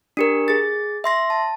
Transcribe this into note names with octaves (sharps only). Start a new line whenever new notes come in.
D4 G4 A#4
G#4 A6
E5 C6 A#6
A5